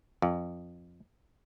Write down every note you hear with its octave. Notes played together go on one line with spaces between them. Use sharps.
F2